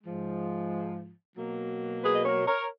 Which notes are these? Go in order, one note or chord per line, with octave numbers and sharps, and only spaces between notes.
G#2 F3 G#3
B2 F#3 A#3
G#4 B4
D#5
A#4 C#5
A#4 C#5